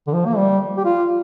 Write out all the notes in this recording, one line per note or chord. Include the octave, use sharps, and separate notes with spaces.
D3
F3
A#3
G3
G4
F4